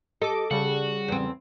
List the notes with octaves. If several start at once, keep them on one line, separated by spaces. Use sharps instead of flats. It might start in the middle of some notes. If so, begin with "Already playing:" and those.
G4 A4 D#5 D6
C#3 G3 F#4 G#4
E2 C4